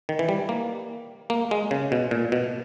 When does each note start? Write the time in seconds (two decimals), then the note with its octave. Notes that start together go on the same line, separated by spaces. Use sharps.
0.09 D#3
0.19 E3
0.29 G3
0.49 A#3
1.30 A#3
1.51 G#3
1.71 C#3
1.92 B2
2.11 A#2
2.32 B2